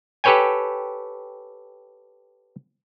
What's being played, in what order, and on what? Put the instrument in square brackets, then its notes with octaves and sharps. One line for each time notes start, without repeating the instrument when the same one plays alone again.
[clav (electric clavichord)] G4 A4 B4 C#5 G5 G#5